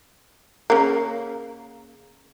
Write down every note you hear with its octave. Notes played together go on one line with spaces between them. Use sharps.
C#3 A#3